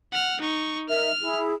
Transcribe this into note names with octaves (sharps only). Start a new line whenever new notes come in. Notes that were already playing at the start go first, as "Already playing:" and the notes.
F#5 F6
D#4 C#6
D#4 A#4 E5 F6
E4 G#4